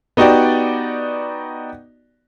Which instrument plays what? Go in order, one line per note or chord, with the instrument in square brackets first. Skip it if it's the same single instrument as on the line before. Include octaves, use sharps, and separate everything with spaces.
[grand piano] B3 D#4 F#4 G4 D5